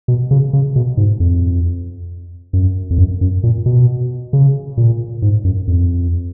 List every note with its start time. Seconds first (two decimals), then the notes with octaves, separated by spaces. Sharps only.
0.08 B2
0.31 C#3
0.53 C#3
0.76 B2
0.97 G#2
1.20 F2
2.53 F#2
2.90 F2
2.98 F#2
3.21 F#2
3.43 A#2
3.66 B2
4.33 C#3
4.77 A#2
5.22 G#2
5.45 F#2
5.67 F2